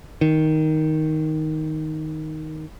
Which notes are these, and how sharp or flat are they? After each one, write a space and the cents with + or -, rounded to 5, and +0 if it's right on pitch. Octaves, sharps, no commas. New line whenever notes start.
D#3 +5